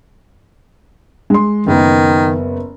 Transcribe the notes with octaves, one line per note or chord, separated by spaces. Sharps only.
G#3 C6
F#1 D#3 B3